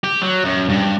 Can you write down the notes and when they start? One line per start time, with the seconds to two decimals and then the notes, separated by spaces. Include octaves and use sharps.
0.04 G4
0.22 F#3
0.44 F#2
0.69 G2